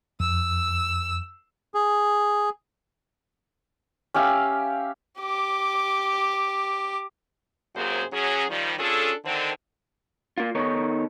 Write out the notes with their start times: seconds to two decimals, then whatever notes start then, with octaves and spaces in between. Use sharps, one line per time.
0.20 F2 E6
1.74 G#4
4.14 C#4 G4 E5 F5
5.20 G4 D6
7.76 F#2 C3 F#3 A#3 G#4 C5
8.13 F#3 C#4 G#4
8.50 D#3 F3 G3
8.79 C#4 D4 F4 G#4 A4
9.25 D3 D#3 C4
10.38 A#3 F4
10.55 D#3 B3 D#4 A4 C#5